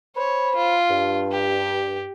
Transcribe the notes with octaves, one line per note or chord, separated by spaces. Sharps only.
C5 C#5 B5
F4
G2
G4